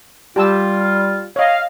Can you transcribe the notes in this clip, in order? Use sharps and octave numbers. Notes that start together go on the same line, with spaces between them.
G3 F4 G4 A5 E6
C#5 D#5 F5